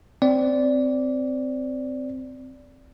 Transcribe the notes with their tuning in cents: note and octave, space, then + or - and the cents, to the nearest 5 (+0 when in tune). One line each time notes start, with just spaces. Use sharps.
C4 -10 D5 -15